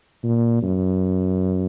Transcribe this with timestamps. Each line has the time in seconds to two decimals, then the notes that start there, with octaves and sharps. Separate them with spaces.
0.24 A#2
0.62 F#2